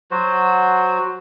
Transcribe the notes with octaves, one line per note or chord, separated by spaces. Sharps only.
F#3 F#4 C5